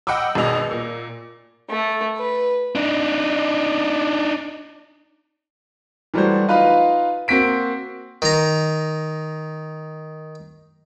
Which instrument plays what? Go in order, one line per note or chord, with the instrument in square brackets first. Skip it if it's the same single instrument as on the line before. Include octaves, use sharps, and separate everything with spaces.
[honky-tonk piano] D#5 F#5 G5 B5 D6 E6
G#1 B2 B3 G#4 D#5 F7
A#2
[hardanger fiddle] A3
B4
[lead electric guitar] D4 D#4
[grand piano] E3 F#3 G3 A3 F#4 C5
D#4 F4 B4 D#5 F5 B5
A#3 C4 F#4 B6 D7
[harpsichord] D#3 A#5